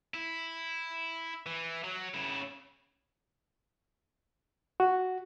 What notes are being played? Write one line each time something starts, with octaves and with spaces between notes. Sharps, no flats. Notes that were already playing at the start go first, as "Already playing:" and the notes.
E4
E3
F#3
C#3 E4
F#4